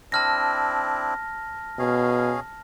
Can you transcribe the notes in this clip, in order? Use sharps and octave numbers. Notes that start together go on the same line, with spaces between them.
C4 D4 E4 A5 F6 A#6
B2 C#4 G#4 F5